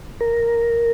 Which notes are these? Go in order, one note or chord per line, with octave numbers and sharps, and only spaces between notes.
A#4